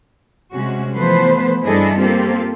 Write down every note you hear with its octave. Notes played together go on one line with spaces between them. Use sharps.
C3 G#3 C#4 F#4
E3 F3 A3 B3 B4 C5
G2 D4 E4 G#4 A4 D#5
A#3 C4 F4 G4 A4